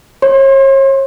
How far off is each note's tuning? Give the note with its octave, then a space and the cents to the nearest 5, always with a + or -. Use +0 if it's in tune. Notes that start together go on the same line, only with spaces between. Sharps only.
C#5 -40 C6 +20